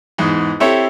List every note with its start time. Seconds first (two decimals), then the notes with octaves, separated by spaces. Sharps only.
0.18 E2 G#2
0.60 C4 E4 G4 A4 C5 C#5